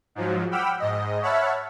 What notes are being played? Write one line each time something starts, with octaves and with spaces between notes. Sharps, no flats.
G#2 F3 F#3
F#5 G5 B5 D6 E6 F6
G#2 D#5
C#5 E5 F#5 A5 B5 F6